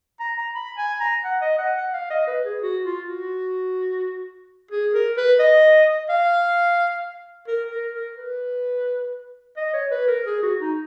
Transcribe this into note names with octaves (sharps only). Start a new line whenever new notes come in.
A#5
A#5
B5
G#5
A#5
F#5
D#5
F#5
F#5
F5
D#5
B4
G#4
F#4
F4
F#4
G#4
A#4
B4
D#5
F5
A#4
A#4
A#4
B4
D#5
C#5
B4
A#4
G#4
F#4
D#4